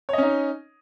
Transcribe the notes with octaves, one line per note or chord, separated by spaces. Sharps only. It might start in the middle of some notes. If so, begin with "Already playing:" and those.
C#4 D#4 C#5 D#5